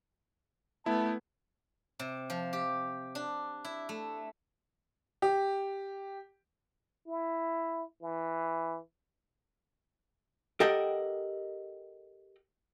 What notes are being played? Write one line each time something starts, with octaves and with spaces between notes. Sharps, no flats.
A3 B3 E4 A5
C3
F3
G4
D4
E4
A3
G4
E4
E3
G4 A4 A#4 D#5 F#5 G5